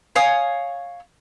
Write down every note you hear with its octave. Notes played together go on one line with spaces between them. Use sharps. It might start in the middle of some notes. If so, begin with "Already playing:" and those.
C#5 F5 G#5 D#6